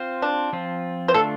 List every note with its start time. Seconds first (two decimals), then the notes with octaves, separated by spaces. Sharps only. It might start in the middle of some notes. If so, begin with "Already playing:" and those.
Already playing: C4 F4 C5
0.22 D4
0.53 F3 C4 F4
1.08 C5
1.14 D3 A3 D4 F4 A4